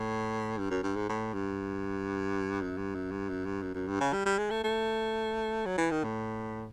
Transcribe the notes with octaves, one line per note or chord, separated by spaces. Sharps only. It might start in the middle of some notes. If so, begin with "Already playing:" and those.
Already playing: A2
G2
F#2
G2
G#2
A2
G2
F#2
G2
F#2
G2
F#2
G2
F#2
F#2
G2
C#3
G3
G3
G#3
A3
A3
F#3
E3
D#3
A2